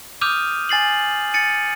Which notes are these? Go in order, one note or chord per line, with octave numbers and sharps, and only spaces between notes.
D6 D#6 F6 G6 D#7 F7
G#5 A6 C7 F#7
A6 C#7 D#7